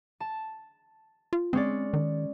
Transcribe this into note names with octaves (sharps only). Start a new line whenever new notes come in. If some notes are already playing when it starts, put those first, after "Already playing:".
A5
F4
G#3 C4 C#4 D5
D#3